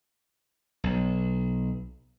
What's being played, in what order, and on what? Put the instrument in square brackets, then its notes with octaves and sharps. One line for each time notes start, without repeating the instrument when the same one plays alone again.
[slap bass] B1